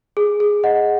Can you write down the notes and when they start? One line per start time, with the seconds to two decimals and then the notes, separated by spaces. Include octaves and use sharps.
0.17 G#4
0.40 G#4
0.64 D#5 F#5